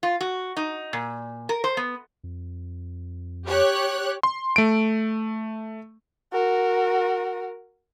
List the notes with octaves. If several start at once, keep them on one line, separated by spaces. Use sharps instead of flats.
F4
F#4
D#4
A#2
A#4
C5
B3
F2
G4 C#5 F#6
C6
A3 D7
F#4 A#4